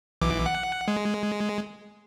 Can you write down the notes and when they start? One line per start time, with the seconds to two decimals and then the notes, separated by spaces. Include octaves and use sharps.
0.21 B1 E3 D6
0.46 F#5
0.88 G#3